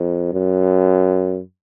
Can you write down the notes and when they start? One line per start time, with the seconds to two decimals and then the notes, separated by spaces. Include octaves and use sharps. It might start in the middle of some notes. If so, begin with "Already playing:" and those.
Already playing: F2
0.33 F#2